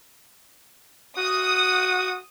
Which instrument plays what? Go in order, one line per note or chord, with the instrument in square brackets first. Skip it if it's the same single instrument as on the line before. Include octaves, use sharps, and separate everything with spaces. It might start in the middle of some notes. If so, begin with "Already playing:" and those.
[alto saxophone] F#4 [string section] D#6